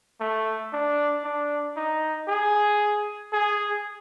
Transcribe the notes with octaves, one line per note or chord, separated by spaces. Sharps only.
A3
D4
D4
D#4
G#4
G#4